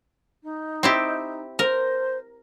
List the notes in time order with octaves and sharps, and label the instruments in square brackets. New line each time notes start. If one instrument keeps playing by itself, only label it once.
[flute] D#4
[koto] C4 E4 G4
[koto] A#4 [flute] C5